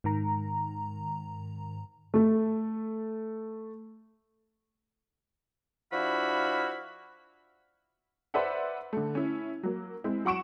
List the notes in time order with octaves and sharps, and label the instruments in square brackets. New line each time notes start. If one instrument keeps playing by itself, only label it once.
[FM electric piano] G#2 D#3 A#5
[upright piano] A3 A4
[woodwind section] F3 D4 E4 F#4 F5 B5
[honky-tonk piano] B4 C5 D5 E5 F#5
D3 A3
C#4 E4
F#3 A#3
G#3 C4 E4
F#3 F#5 C#6 D7 E7